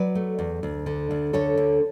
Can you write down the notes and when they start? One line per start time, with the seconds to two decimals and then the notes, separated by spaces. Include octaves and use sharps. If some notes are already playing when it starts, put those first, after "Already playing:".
Already playing: F#3 B4 D5
0.15 A3
0.39 E2
0.63 D2
0.86 D3
1.11 D2
1.33 D3 A4 C#5
1.57 D2